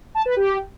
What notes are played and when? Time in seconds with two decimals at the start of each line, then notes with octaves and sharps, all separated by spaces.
0.15 A5
0.26 B4
0.36 G4